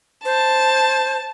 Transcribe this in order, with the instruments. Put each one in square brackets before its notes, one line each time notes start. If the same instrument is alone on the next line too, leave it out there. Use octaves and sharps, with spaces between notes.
[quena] C5 [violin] A5